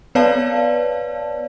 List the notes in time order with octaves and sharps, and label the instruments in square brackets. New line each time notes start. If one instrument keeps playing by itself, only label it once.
[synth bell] B3 B4 C#5 D5 F5 A5